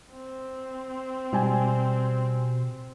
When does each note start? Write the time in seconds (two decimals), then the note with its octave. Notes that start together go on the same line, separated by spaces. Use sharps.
0.14 C4
1.33 B2 G3 G5 G#5